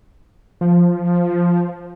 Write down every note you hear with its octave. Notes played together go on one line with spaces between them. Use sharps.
F3